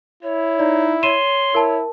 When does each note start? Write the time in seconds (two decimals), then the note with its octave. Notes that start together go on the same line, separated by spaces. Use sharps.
0.23 E4 C#5
0.59 D#4 D5
1.03 C#5 C6 D#7 E7
1.55 E4 A#4 A5